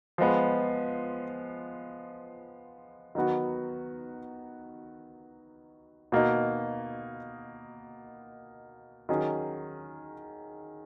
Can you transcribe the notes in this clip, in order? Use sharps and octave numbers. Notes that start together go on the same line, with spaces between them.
F3 G#3 B3
D#3 F#3 B3 F#4
B2 A#3 D#4
D#3 F#3 C#4 G#4